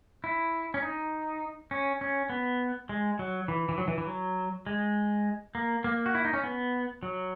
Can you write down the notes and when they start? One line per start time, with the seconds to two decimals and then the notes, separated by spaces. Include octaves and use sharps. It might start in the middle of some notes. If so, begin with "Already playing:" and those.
0.24 E4
0.74 C#4
0.82 D#4
1.71 C#4
2.01 C#4
2.30 B3
2.89 G#3
3.19 F#3
3.48 E3
3.69 E3
3.78 F#3
3.88 E3
3.98 E3
4.07 F#3
4.67 G#3
5.55 A#3
5.84 A#3
6.06 F#4
6.15 E4
6.25 D#4
6.33 C#4
6.44 B3
7.03 F#3